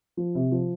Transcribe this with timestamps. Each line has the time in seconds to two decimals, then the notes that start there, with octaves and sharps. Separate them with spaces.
0.17 F3
0.35 C3
0.52 F3